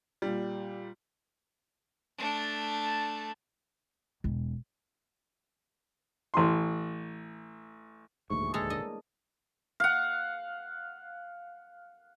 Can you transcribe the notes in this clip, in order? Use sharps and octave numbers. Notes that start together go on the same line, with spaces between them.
A#2 G3
A3 D4
E1
A1 C6
D#1 D2 G#2 E3 A3 A#3 C#6
G3 G#4
G#3 A#3 A4 C#5
D4 A#4 D#5
F5 F#5